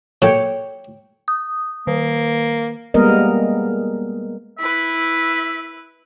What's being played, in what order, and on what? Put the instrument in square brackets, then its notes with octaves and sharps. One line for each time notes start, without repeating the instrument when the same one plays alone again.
[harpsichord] A#2 F#3 A4 [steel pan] C#5 G5
[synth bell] D#6
[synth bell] D#3 [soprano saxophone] A#3
[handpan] G3 G#3 A#3 B3 A#4 D#5
[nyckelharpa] E4 B4 [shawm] E5